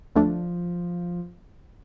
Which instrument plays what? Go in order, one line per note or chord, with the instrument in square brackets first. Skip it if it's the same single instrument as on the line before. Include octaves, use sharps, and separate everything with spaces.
[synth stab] D2 A3 D4 [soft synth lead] F3